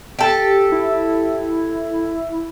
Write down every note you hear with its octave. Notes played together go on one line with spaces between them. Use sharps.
G4 A4
E4